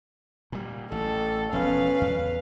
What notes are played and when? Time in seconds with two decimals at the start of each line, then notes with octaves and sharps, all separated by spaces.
0.52 A#2 G3
0.92 A1 A4
1.53 E1 F3 B3 C#4 B4 F5
2.01 E2